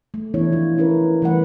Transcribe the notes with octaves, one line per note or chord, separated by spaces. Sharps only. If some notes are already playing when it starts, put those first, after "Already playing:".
A3
E3 B3 D4 E4 C#5
F3 F4
C#4 E4 A#4 B4
E3 G3 A3 B4 F#5